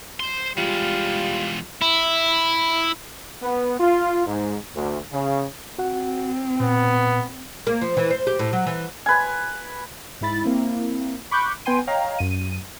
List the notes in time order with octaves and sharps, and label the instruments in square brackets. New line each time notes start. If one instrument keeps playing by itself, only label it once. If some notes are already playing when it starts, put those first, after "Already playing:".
[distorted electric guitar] C5 C6
[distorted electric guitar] E2 G#3 [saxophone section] G3 F4
[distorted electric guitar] E4
[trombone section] B3
F4
G#2
D2
C#3
[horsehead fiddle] C4 [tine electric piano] F#4 F#5
[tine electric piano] A#2 [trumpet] B3
[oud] A#3
F3
E3
C5
G4
A2
F#3
E3
[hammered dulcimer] B4 G#5
[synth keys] G#2 G#3 E4 B5 A6
A#3 C4 E4
B5 C#6 D6 F#6 G6
B3 B4 G5 G#5 C6 D#7
C#5 D#5 F5 G5 A#5
F#2 D#7